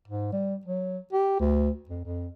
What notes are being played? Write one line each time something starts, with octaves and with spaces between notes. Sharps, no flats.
G#2
G3
F#3
G4
D2
F2
F2